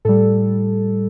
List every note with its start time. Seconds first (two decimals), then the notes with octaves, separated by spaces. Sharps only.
0.05 A2 G3 A4